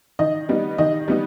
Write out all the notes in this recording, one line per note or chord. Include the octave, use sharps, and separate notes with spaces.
D#3 D#5
G3 B3 D#4
D#3 D#5
G3 B3 D#4